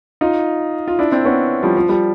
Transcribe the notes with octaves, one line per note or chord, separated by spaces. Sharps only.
D#4 F4
F4
D4 E4
C4 D4
B3 C#4
F3 G3
F3
F3 G3